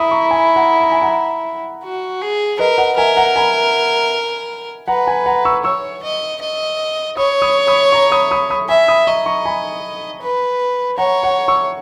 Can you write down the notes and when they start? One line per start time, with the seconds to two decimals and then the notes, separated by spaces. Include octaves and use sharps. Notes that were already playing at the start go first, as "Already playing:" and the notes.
Already playing: E4 A#5 B5 D#6
0.11 A#5 C#6
0.31 G#5 B5
0.56 F#5 A#5
0.82 A#5
0.92 G#5
1.02 F#5 A#5
1.84 F#4
2.21 G#4
2.59 A#4 B4 D#5
2.78 D#5 F#5
2.97 A#4 E5 G#5
3.17 F#5 A#5
3.36 G#5 B5
4.88 B4 F#5 A#5
5.07 G#5 B5
5.26 F#5 A#5
5.45 C#6 E6
5.64 C#5 C#6 E6
6.03 D#5
6.41 D#5
7.17 C#5 B5 D#6
7.42 B5 D#6
7.67 B5 D#6
7.92 A#5 C#6
8.12 B5 D#6
8.31 B5 D#6
8.50 B5 D#6
8.69 E5 G#5 B5
8.88 B5 D#6
9.07 D#5 A#5 C#6
9.26 A#5 C#6
9.45 G#5 B5
10.21 B4
10.98 C#5 F#5 A#5
11.23 F#5 A#5
11.48 C#6 E6